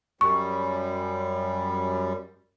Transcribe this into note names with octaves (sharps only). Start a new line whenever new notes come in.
F#2 G3 C#6